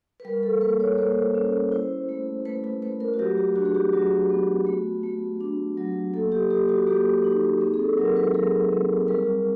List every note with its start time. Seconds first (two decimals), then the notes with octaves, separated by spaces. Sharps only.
0.20 B4
0.25 G3 A#4
0.43 A4
0.61 A#3 B4
0.80 C#5
0.98 A#3 C5
1.35 C#4
1.72 E4 C5
2.09 A3
2.45 A3 B4
2.64 B4
2.82 A3 B4
3.00 A#4
3.14 F#4
3.19 F#3 G4
3.37 G4
3.56 D4 F#4
3.65 G#4
3.75 G4
3.93 F#3 F#4
4.30 B3
4.67 A3
5.03 A3
5.40 D4
5.77 F#3
6.14 A#3 A4
6.32 G4
6.50 A#3 G4
6.69 F#4
6.87 A#3 G4
7.24 D#4
7.61 C4 G#4
7.74 G#4
7.79 A4
7.98 F#3 A#4
8.16 B4
8.34 F#3 G#4
8.71 C4
9.08 G3 A#4